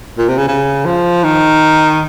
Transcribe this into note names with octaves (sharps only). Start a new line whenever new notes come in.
A#2
C3
C#3
C#3
F3
D#3